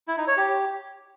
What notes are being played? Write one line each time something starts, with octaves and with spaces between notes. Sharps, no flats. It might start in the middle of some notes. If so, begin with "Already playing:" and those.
E4
D#4
C#5
G4